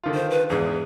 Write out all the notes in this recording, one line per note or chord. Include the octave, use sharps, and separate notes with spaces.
D3 D#3 F4
C5
B4
E2 G#2 G#4